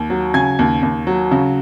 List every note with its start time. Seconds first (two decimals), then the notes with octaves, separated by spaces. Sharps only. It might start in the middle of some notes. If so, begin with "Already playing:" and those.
Already playing: D#2
0.10 F#3
0.34 C#3 G#5 G#6
0.59 D#2
0.83 D#2
1.07 F#3
1.31 C#3